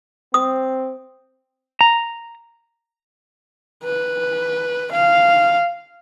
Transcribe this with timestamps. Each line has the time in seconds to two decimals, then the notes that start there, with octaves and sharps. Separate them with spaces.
0.34 C4 D#6
1.81 A#5
3.84 B4
4.92 F5